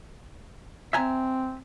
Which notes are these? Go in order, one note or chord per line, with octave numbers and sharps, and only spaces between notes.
C4 E5 G#5 A#5